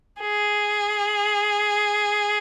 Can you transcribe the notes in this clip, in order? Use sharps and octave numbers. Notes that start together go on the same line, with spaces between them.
G#4